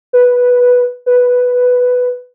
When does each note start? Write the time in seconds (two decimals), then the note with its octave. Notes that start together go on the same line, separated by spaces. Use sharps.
0.13 B4
1.06 B4